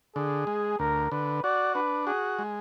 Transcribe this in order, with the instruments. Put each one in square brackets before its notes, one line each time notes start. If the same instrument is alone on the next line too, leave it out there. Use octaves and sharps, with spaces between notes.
[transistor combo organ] D3 [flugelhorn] G#4
[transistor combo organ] G#3
[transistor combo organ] D2 [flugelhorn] A#4
[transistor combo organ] D3 [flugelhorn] B4
[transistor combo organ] F#4 [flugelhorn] D5
[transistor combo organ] D4 [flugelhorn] B4
[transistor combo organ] F#4 [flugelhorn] G#4
[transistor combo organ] G#3